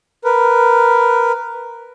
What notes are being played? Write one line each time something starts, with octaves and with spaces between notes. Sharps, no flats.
A#4 B4